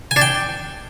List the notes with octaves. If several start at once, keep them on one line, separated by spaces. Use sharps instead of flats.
G#5
D4
G5